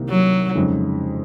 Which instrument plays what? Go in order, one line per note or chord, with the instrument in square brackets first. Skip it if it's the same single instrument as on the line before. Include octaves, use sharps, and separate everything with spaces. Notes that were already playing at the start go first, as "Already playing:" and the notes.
Already playing: [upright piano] C2 C3 D#3 A#3 D#4
[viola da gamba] F#3
[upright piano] F2 C#3 G#3 D#4